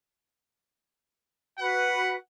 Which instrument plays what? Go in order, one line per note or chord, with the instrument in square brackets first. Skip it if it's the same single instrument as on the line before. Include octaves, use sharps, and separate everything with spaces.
[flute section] F#4 B4 [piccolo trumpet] F#5